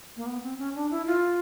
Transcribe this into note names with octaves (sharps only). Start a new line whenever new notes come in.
A#3
B3
C4
C#4
D4
E4
F4